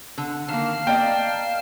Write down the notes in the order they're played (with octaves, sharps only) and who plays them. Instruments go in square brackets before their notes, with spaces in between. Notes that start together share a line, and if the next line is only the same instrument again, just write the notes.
[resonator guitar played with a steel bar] D3
[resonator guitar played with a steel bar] D#3 A#3 [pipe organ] F5 A5 F6
[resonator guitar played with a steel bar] A#3 D5 D#5 [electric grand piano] G5